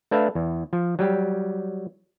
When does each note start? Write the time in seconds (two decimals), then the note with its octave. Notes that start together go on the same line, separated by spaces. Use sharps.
0.11 A3 D4 B4 E5 F5
0.35 E2
0.73 F3
0.99 F#3 G3 G4